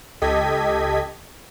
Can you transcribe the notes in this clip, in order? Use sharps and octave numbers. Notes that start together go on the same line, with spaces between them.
C#2 G4 A4 D#5 G#6 B6